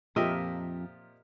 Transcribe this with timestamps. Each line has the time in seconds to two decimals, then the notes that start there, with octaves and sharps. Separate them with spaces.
0.16 F2 A#2 F3 G4 A#4 D#5 E5